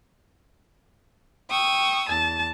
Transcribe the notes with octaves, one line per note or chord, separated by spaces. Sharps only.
G5 C#6 D#6 E6
E2 A5